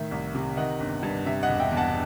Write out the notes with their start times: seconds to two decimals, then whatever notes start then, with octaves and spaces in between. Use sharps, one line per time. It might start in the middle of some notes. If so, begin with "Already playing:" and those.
Already playing: A2 D#3 E5
0.11 C2
0.35 C3
0.57 D#3 D#5 F#5
0.80 G1
1.03 G2
1.26 C3 E5
1.43 D#5 F#5
1.49 E1
1.60 E5 G5
1.71 E2
1.77 F#5 A5